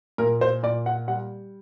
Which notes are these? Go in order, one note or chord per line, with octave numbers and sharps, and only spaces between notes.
A#2 A#4
C5
A#2 D5
F#5
G3 F#5